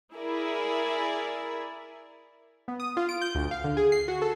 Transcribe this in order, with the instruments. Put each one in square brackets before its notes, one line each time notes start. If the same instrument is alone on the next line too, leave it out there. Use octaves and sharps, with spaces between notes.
[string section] E4 G#4 A#4 D5 E5 G#5
[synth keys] B3
D#6
F4
D7
G6
D2
F5
D3
G#4
C7
F#4
A4